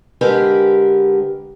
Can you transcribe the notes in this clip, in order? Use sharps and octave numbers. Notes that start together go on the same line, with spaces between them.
D3 G#3 G4 A#4 B4